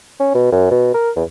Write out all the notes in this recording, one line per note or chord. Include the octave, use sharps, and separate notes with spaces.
C#4
B2
F#2
B2
A#4
E2